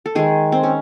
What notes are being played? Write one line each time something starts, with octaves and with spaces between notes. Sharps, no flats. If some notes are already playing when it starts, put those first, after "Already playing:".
A4
D#3 G#3 G#4
C4
C#4